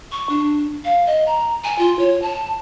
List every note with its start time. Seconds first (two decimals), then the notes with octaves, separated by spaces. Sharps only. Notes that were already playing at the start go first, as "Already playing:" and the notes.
0.12 C#6
0.29 D4
0.85 F5
1.07 D#5
1.27 A#5
1.64 G#5
1.79 F4
1.99 C#5
2.22 A5